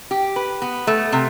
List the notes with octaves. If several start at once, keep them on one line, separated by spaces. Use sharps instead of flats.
G4
B4
B3
A3
C3